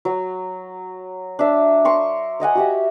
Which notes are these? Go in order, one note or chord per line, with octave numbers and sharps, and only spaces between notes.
F#3
D4 E5
A#4 C6 C#6
C#5 D#5 F#5 G#5
F#4 G4 E5